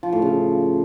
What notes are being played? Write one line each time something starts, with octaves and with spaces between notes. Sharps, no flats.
F3
A2
C#3